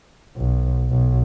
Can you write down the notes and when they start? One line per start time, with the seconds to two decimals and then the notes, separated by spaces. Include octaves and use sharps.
0.36 B1
0.90 B1